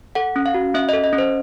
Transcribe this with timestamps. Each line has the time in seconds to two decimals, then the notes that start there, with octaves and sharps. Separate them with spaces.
0.15 A4 F#5
0.36 C#4
0.46 F5
0.54 F#4
0.74 C#4 E5
0.89 A4 D#5
1.04 D#5
1.13 C#4
1.18 C5